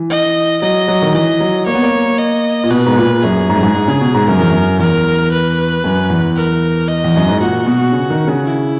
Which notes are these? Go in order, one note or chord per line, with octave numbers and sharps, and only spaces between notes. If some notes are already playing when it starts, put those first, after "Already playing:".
Already playing: E3
D#5
F#3 D#5
F#3
D#3
E3 D#5
F#3
A#3 C#5
B3
A#3
D#5
A#2
B2 B4
G#2
A#2
F#2 G#4
G#2
F#2
G#2
G#2
C#3
B2
G#2
F#2 A#4
E2
F#2
E2 A#4
B4
F#2
E2
A#4
D#5
E2
F#2
G#2
A#2 F#4
B2
C#3
D#3
C#3
E4